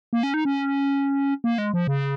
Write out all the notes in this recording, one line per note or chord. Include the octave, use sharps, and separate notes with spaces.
A#3
C#4
D#4
C#4
A#3
G#3
F3
C#3